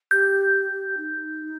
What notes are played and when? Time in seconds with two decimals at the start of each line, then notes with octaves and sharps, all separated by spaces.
0.11 G4 G6
0.97 D#4